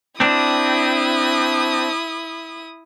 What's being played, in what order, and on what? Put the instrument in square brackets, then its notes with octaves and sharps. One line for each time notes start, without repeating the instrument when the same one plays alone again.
[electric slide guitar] C4 D4 [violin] E4 D#6